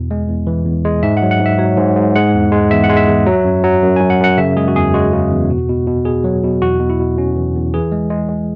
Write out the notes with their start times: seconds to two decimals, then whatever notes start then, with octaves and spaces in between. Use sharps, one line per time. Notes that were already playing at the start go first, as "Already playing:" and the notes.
Already playing: E2 B2
0.11 G#3
0.29 E2
0.47 E3
0.66 E2
0.85 G#3
1.03 G#2 E5
1.17 F#5
1.22 F#3
1.31 F#5
1.40 G#2
1.46 E5
1.58 F#3 C#5
1.77 G#2
1.96 G#2
2.16 G#3 F#5
2.34 E2
2.52 G#3
2.71 E2 E5
2.84 F#5
2.89 G#3
2.97 E5
3.08 E2
3.27 F#3
3.45 F#2
3.63 F#3
3.82 F#2
3.96 G#5
4.01 F#2
4.10 F#5
4.20 F#2 F#5
4.38 C#3 E5
4.57 G#3 G#4
4.68 F#4
4.76 E2 G#4
4.94 G#3 F#4
5.13 C#3
5.32 E2
5.50 B2
5.69 B2
5.87 B2
6.05 B2 G#4
6.24 F#3
6.44 B2
6.62 E2 F#4
6.80 B2
6.90 E4
6.99 B2
7.18 B2 C#4
7.36 E2
7.55 E2
7.74 E3 G#4
7.92 G#3
8.10 G#3
8.29 G#3